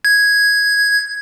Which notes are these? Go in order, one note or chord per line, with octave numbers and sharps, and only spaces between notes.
G#6